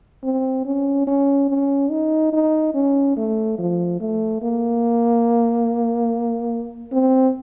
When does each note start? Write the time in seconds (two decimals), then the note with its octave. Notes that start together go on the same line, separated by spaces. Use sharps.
0.24 C4
0.65 C#4
1.07 C#4
1.50 C#4
1.91 D#4
2.33 D#4
2.74 C#4
3.17 A3
3.58 F3
4.00 A3
4.42 A#3
6.92 C4